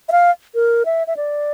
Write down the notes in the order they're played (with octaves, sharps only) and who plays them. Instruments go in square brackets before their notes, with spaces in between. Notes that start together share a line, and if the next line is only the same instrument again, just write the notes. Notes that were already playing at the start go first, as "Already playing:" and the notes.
[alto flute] E5
F5
A#4
E5
E5
D5